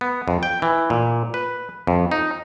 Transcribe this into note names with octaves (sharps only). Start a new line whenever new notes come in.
B3
F2
G5
E3
A#2
B4
F2
D#4